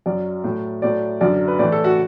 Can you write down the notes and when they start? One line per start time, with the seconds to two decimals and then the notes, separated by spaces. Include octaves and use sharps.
0.06 F#2 F#3 D5
0.44 A2 F#3
0.82 A2 F#3 D5
1.21 F#2 D3 F#3 D5
1.48 B4
1.59 A2 E3 D5
1.72 A4
1.84 F#4